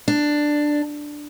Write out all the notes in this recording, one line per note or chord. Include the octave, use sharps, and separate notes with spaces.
D4